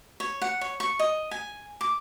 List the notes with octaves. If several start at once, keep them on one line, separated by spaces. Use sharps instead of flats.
C#5
F#5
C#5
C#6
D#5
G#5
D6